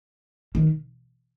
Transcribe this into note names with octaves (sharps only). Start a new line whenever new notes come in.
D#3